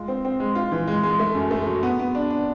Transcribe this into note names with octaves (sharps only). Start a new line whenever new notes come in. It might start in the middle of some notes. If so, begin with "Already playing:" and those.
Already playing: G#3 F4
C4
C4
G#3
F4
E3
G#3
G#3
A3
F#2
A3
F#3
B3
B3
D4
D4